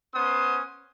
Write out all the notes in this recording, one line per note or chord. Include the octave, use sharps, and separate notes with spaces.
B3 C#4 C5 C6 D#6